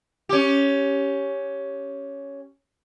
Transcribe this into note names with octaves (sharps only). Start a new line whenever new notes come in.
C#4 G4